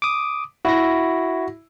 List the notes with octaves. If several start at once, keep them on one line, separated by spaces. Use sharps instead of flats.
D6 D#6
E4 F#4 A#6